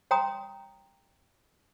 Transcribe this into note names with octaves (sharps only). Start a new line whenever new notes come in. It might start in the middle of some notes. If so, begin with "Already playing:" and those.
C#5 G5 A#5 C6 D#6